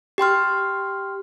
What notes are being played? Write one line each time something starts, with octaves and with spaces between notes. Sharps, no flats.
G4 G5 C6 F6